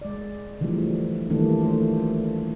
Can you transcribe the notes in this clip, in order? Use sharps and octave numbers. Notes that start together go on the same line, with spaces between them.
G#3 D5
D3 E3 F3 G3 A3
D#3 E3 G3 A3 A#3 D4
E3 A3 D4 F4 C5